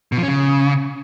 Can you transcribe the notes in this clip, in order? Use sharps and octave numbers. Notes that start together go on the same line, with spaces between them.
B2
F3
C#4
C#3